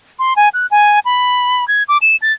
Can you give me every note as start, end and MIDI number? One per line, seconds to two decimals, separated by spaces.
0.19 0.36 84
0.36 0.49 80
0.54 0.66 90
0.71 0.99 80
1.05 1.67 83
1.68 1.83 92
1.88 1.98 86
2.02 2.16 100
2.22 2.33 93